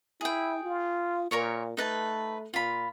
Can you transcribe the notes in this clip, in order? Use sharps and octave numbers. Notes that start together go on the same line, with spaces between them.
E4 G#4 G5
F4
A#2 A#4 C#5 C#6
A3 D#4 B4 A5
A#2 F4 B5